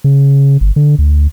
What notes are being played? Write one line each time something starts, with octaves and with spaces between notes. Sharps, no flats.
C#3
G1
D3
D2